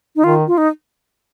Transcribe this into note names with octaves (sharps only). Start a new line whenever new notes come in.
D#4
D#3 F4
F4
D#4